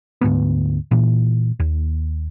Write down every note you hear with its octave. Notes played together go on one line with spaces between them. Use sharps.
D2 G#2 A#3 B3
A#2 E3
D#2